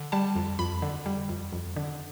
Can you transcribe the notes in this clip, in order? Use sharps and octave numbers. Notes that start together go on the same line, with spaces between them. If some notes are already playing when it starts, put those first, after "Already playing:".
Already playing: D3
G3 A5
F2
F2 B5
D3
G3
F2
F2
D3